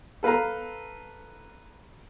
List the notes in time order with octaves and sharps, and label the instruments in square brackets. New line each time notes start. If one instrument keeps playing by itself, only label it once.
[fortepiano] A4 B4 F5 A#5